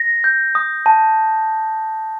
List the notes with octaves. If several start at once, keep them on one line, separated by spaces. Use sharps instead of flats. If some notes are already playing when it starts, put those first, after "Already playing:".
Already playing: A#6
G6
D#6
A5